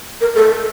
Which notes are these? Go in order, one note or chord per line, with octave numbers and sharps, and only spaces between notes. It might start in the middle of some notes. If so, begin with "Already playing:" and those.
A#4
A4